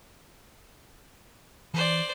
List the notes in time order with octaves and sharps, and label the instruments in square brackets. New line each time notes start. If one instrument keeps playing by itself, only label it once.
[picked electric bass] E3 [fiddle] C5 D5